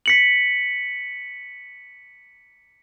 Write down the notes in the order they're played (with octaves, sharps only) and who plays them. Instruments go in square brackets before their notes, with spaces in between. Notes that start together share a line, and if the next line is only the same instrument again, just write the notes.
[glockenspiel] B6 C#7 F#7